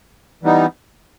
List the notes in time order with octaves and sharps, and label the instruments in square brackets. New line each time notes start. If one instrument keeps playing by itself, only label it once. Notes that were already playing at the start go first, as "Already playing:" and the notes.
[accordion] E3 G3 B3 D#4